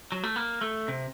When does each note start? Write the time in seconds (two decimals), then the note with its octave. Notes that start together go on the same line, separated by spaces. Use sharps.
0.12 F#3
0.23 A3
0.36 A#3
0.61 A3
0.88 C3